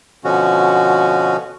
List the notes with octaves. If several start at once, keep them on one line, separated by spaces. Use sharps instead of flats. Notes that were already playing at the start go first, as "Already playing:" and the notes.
B2 D3 F3 C#4 F#4